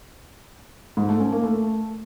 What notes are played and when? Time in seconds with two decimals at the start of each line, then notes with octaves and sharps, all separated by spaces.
0.97 G#2
1.09 A3
1.20 C#4
1.32 A#3
1.44 A3